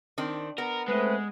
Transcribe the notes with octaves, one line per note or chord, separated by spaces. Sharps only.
D#3 C4 D4
B3 A#4
G#3 A3 C4 B4